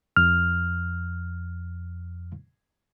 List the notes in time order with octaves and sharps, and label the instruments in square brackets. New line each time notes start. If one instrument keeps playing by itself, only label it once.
[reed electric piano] F2 F6